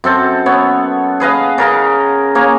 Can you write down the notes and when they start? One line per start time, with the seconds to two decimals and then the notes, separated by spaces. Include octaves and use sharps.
0.04 F#2 C4 A4
0.46 B3 C#5
1.20 G#4 B4 D#5 F5
1.58 C#3 A#4 D#5
2.35 A#3 G#4 C#5